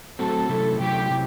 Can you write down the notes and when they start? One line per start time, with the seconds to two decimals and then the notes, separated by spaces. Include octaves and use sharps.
0.19 F#3 A3 C4 F#4 A4
0.49 C3 F#3 A3 E4
0.79 C3 F#3 A3 E4 G4
1.10 C3 F#3 E4